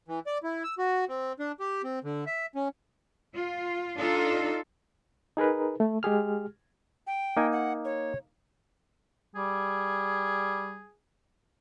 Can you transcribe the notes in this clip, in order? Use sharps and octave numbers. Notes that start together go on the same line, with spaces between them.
E3
D5
E4
E6
F#4
C4
D4
G4
C4
D3
E5
C#4
F4
D4 D#4 F4 A4
D#4 G#4 A#4 B4
A3
G#3 G4 G#4 F6
G5
A#3 D#4 G#5
F#5
C#5
G3 G#4